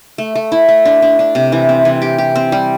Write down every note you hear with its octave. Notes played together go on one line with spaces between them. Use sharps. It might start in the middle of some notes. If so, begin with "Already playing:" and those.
A3
A3
E4
A3
D4
D4
D4
C3
E3
C4
E3
G4
G4
C4
G3